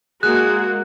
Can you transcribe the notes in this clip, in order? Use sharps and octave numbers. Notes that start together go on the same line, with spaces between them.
G#3 A#3 F#4 G#4 F#6